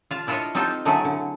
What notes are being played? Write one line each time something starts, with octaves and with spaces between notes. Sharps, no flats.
F4 F5 A5
D4 E4 F4 A4 C#5 D#5
C4 D#4 F4 G4 A4 G5
D3 F#3 A3 E4 G#4 A4
D3